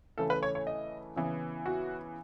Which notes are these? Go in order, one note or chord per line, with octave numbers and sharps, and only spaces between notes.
C#3 E3 A3 A4
B4
C#5
C#5
D#5
C#3 E3 B3
F#4